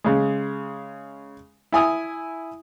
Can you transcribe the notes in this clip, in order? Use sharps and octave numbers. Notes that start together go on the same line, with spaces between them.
C#3 G#3
E4 G#5 D#6